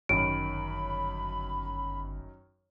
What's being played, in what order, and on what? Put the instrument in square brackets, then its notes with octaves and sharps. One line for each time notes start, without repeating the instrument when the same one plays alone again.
[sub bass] G1 [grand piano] F#2 D#3 [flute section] B5 [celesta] D7